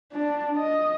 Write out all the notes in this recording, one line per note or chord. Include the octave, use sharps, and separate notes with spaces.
D4
D#5